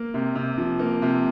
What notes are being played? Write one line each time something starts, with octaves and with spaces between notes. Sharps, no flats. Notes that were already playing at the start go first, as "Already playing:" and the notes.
Already playing: A#3
C3
C3
F3
A#3
C3